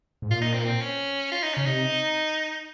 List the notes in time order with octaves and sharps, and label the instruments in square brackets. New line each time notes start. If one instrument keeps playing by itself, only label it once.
[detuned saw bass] G#2
[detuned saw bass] A#2 [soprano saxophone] F4
[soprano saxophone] D#4
C4
A#3
C4
C#4
F4
D#4
[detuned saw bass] C#3 [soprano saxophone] C#4
[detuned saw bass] C3 [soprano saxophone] D#4